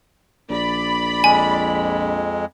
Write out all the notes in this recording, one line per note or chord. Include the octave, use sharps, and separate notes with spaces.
A#1 D5 B5
F2 G#3 G#5